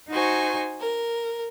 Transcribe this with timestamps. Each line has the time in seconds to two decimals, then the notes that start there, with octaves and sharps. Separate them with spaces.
0.10 D#4 F#4 C5 G#5 C#6
0.80 A#4